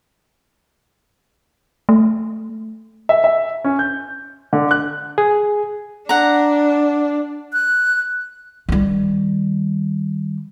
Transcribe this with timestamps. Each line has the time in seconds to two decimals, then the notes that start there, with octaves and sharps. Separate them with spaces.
1.89 A3
3.09 E5
3.24 E5
3.64 C#4
3.79 G6
4.53 D3
4.71 F#6
5.18 G#4
6.09 D4 F#5 A#5
7.53 F#6
8.69 D#3 G3